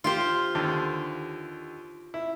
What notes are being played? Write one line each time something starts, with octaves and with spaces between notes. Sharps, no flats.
F4 G4 C5
D#2 D3
E4